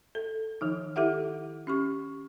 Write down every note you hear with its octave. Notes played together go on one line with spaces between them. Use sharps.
A4
D#3 F3 D#4
E4 G4 A4 E5 F#5
C#4 G4 C#6